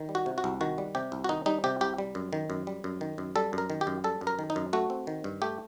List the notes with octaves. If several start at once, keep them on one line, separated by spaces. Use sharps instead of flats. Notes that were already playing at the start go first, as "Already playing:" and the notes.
Already playing: D#3
G3
F#4
C3
F#4
C2
D#3 F#4
G3
C3 G4
C2
F#4
D#3 D#4
G3 D#4
C3 G4
C2 G4
G3
F#2
D#3
F#2
G3
F#2
D#3
F#2
G3 A4
F#2 A#4
D#3
G4
F#2
G3 A4
F#2
A#4
D#3
D#4
F#2
A3 F#4
C4
D#3
G2
A3 G4